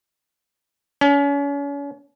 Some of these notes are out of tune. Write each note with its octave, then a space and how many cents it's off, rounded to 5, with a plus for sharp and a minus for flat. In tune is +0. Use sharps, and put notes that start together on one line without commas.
C#4 +35